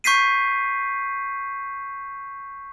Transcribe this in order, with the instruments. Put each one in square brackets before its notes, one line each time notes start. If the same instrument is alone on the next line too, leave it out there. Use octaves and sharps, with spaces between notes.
[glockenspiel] C#6 G6 B6 C7 D#7